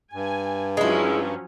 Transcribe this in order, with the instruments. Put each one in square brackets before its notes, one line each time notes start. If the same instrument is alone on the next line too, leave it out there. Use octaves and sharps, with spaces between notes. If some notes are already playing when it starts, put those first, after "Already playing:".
[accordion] G2 [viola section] G#5
[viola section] F3 F#3 C#4 [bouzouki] G#3 E4